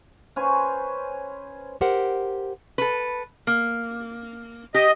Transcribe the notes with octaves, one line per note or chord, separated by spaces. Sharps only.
C#4 B4 C5 G#5
G4 A#4 C5 F#5
A4 B4
A#3
G4 D#5